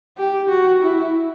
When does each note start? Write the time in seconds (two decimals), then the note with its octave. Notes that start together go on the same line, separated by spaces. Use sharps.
0.18 G4
0.49 F#4
0.82 E4